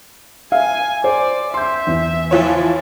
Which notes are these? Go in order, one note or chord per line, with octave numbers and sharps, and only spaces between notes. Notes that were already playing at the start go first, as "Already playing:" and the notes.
E5 F5 G#5
C5 D5
E5 C6 G6
E2
E3 F3 C#5